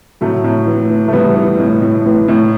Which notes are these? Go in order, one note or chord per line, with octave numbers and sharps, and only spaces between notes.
A2 F#3 A3
A2
E3
E3
A3
E3 G3 B3
E3
A2
A2
E3
A2